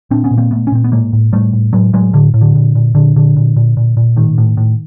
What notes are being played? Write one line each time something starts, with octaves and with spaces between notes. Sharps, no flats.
A#2 C4 D4
B3 C#4
A#2
A#3 C4
A#2 A3 B3
C#4
A#2 C4
B3
A2 G#3 A#3
A2
A2 G3 A3
A2
A2 F#3 G#3
A2 F#3 G#3
A2 D3
A2
D3
A#2
A#2
A#2 D3
A#2 D3
A#2
A#2
A#2
A#2
A2 D#3
A2
A2